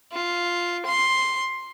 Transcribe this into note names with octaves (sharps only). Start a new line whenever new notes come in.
F4
C6